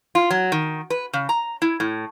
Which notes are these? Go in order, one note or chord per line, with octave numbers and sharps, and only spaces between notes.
F4
F#3
D#3
B4
C#3
A#5
E4
A2